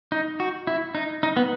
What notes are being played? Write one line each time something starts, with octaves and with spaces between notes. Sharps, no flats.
D#4
F#4
E4
D#4
D#4
B3